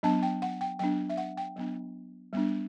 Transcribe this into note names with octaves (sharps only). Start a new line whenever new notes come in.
F#3 B3 D4 A5
G5
F#5
G5
F#3 B3 D4 G5
E5
F#5
G5
F#3 B3 D4
G3 B3 D4